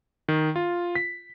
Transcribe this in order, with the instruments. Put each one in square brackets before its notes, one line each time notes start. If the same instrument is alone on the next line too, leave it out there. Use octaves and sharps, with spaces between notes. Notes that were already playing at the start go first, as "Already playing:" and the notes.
[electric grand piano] D#3
F4
B6